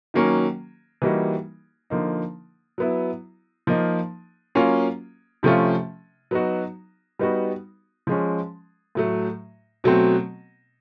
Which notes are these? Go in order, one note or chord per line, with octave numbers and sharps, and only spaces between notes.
D#3 F#3 A#3 C#4
E3 G3 A#3 D#4 F#4
D3 F3 A#3 D#4
F#3 B3 E4
F3 A#3 D#4
F#3 A#3 C#4 F4
C3 F3 A3 C#4 F4
F#3 B3 D#4 F#4
G3 B3 D#4 F#4
F3 G#3 C#4
A2 F#3 A3
B2 F#3 A3 C4